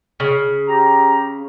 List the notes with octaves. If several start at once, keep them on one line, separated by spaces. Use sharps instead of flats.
C#3
G4 A#5